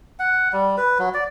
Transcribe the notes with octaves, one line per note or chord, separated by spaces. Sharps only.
F#5
G3
B4
F#3
D5